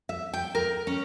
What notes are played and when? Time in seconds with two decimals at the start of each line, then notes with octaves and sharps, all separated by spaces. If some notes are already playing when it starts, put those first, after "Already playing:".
0.09 E5
0.34 G5
0.55 A#4
0.87 C#4